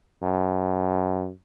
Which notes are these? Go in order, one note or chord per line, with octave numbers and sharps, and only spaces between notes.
F#2